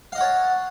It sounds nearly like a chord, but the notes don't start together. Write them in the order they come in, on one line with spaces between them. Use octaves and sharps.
F5 D#5 F#5 C#5 A5